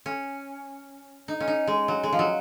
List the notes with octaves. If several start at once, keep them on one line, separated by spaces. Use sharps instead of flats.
C#4
D#4
C#4
D#4
G#3
F#3
G#3
F3
F#3